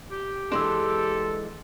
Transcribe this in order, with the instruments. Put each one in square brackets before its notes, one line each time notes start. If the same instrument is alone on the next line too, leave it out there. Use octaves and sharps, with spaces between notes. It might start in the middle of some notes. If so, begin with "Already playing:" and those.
[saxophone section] G4
[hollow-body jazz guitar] E3 G#3 D4 [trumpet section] A4 [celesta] C6 E6